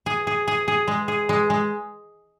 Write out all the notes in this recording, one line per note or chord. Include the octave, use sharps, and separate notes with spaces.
G#4
G#4
G#4
G#4
G#3
G#4
G#3
G#3